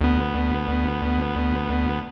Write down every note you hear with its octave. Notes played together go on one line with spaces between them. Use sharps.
D2 B3